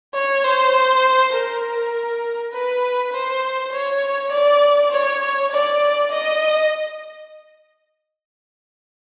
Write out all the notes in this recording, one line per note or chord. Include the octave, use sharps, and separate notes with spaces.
C#5
C5
A#4
B4
C5
C#5
D5
C#5
D5
D#5